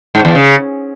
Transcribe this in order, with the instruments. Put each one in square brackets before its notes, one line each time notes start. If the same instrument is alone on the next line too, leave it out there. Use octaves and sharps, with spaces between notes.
[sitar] G#2
E2
C#3